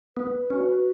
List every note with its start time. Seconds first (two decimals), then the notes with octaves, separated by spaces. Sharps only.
0.16 B3 B4
0.50 C#4 F#4